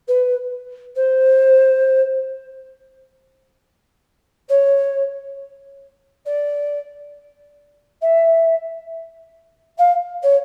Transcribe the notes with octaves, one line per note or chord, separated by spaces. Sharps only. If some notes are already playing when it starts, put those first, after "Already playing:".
B4
C5
C#5
D5
E5
F5
C#5